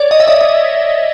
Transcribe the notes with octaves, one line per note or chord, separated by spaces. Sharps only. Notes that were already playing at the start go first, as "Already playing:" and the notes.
Already playing: C#5 D5
D#5
E5
D#5
D#5